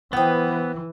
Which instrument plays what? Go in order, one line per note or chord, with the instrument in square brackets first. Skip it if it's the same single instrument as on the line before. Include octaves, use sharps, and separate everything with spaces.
[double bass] E3 [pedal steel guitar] B3 [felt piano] C5 F#5 [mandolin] G5 D#6